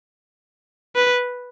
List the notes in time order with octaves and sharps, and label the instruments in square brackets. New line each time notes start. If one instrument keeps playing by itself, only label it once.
[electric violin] B4